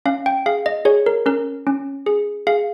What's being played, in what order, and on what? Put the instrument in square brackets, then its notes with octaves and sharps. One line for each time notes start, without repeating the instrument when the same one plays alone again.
[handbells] C#4 F5
G5
G#4 F5
D#5
G#4 C#5
A#4
C#4 A#4
C#4
G#4
G#4 F5